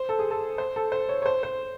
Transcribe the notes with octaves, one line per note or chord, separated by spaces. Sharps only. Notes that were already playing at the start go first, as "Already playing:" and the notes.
Already playing: C5
A4
G#4
A4
C5
A4
C5
C#5
C#5
C5
C5